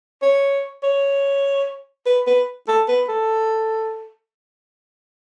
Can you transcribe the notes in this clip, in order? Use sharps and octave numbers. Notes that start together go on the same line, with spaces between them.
C#5
C#5
B4
B4
A4
B4
A4